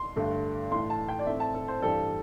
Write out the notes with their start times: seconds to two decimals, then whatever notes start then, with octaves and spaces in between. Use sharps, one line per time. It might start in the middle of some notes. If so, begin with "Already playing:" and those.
Already playing: C6
0.16 G2 D3 A3
0.71 A2 E3 A3 C6
0.90 A5
1.08 G5
1.19 D5
1.26 A2 A3 C4 E5
1.40 A5
1.54 A4
1.68 C5
1.82 G2 E3 G3 A4